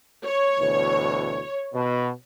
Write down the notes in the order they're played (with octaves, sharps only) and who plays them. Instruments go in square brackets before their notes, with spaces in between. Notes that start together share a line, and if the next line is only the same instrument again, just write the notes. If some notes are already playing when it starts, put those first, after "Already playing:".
[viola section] C#5
[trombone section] D2 B2 E3
B2